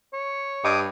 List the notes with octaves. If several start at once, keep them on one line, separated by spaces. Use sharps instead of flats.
C#5
G2 D#5 G5 B5 D6 D#6